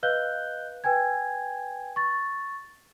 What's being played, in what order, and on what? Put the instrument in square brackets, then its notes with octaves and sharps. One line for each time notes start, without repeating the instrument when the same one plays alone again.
[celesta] B4 D#5 F5 F#6 G6 G7
B4 G5 G#5 G#6
C#6 A6